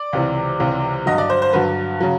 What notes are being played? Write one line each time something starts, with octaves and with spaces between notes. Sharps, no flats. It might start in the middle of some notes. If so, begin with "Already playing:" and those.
Already playing: D5
C#2 C3 E3
C#2 C3 E3
G2 D3 F#3 D#5
D5
C5
C5
G2 D3 F#3 B4
C#3 F#3